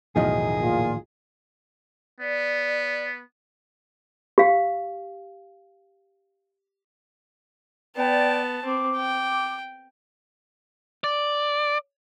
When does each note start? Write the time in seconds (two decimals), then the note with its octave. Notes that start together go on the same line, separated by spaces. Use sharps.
0.16 B1 E2 A2 D#3 F3 G#4 D#5
0.61 A#2 F4
2.20 B3 D5
4.38 G4 F5
7.96 B3 D5 G5 A5
8.65 C4 D6
8.97 G5
11.04 D5